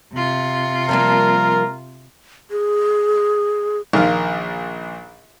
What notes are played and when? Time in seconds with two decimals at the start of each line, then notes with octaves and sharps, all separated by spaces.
0.13 C3 F4
0.89 F3 G3 A#3 A#4
2.51 G#4
3.93 A#1 A#2 D#3 F5